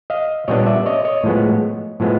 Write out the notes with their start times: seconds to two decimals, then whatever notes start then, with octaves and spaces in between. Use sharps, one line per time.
0.10 D#5 F5
0.48 A#2 G3 B3 D4 C#5 D#5
0.66 D5 E5
0.86 C#5 D#5
1.05 C#5 D#5
1.24 A2 F3 G#3 B3
2.00 A2 F3 G#3 B3